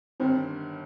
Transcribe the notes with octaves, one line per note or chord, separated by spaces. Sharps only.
G1 G2 D#3 C4